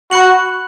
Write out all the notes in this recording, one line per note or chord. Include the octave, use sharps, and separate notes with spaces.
F#4 B5 F#6 C#7 F#7